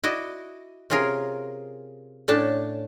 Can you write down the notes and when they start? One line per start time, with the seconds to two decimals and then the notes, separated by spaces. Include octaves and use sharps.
0.04 E4 F#4 D5 D#5
0.90 C3 C#4 F4 G#4 A#4
2.28 A2 A3 C#4 D4 A5